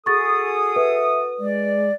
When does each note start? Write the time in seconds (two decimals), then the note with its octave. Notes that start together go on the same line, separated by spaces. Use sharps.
0.06 F#4 G#4 A4 C#6 D#6 A6
0.76 B4 E5
1.39 G#3 D5